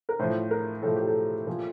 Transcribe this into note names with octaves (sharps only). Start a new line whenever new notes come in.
A#4
A2 F3 C5
A#4
A2 F3 A4
G4
A4
A#2 F3